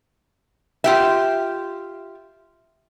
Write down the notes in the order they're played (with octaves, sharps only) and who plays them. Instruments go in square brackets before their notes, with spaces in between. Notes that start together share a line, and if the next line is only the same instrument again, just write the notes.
[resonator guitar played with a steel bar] F4 G4 E5